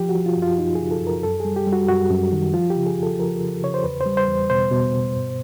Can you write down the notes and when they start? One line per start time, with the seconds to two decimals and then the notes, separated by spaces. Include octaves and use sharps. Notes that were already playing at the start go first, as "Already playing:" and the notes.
Already playing: F3 G4
0.09 F#4
0.15 F3
0.26 F4
0.37 F#2
0.42 F4
0.58 F#2 D#4
0.75 C#3 G#4
0.91 A4
1.02 F#2 A#4
1.23 F#2 A4
1.40 G3 G#4
1.56 G4
1.67 G3
1.73 F#4
1.88 F#2 F#4
2.10 F#2
2.33 D#3
2.54 F3 F4
2.70 G4
2.76 C#3
2.86 G#4
2.97 F2
3.03 A4
3.19 F3 A#4
3.41 C#3
3.63 C#3 C#5
3.74 C5
3.84 E2 B4
4.01 C5
4.06 G3
4.17 C5
4.28 E2
4.50 B2 C5
4.71 B2
4.93 B2
5.16 G2